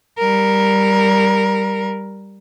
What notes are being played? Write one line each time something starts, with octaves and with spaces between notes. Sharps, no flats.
G3 A#4